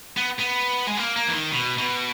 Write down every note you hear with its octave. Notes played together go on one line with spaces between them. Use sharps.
B3
B3
G#3
A#3
A#3
E3
D#3
B2
B2